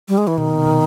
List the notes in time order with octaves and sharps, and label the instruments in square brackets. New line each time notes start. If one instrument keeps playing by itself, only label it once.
[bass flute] G3
G#3
E3
[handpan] B2 [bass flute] D#3
[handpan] C3
B2